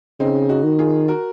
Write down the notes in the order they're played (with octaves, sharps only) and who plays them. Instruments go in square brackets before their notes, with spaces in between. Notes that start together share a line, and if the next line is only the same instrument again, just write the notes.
[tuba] C#3 [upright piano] C4 D#4
[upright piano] D#4 F#4
[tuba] D#3
[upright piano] F4 G#4
F#4 A#4